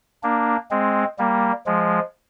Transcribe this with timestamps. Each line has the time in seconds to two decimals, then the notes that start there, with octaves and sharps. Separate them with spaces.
0.23 A#3 D4
0.71 G#3 C4
1.18 G3 A#3
1.66 F3 G#3